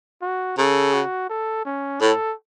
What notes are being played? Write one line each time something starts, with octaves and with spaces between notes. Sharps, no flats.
F#4
C#3 A4
F#4
A4
C#4
A2 A4